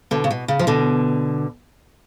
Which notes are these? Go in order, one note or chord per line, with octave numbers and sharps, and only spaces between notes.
B2 D3
C#3
B2
C#3
F3
B2 D3